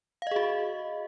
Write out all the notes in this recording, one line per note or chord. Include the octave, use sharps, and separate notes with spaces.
F#4 G#4 D#5 F5